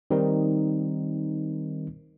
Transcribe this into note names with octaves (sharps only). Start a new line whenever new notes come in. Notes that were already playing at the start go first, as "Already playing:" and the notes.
D#3 G3 C4 D#4 A#4